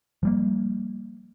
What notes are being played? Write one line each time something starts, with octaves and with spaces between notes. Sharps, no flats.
F3 G3 A#3